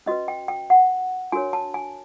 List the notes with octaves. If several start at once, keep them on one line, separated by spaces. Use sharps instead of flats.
C#4 F#4 B4 D#5
G5
G5
F#5
D4 F#4 A#4 C#5 G#5
A5
G#5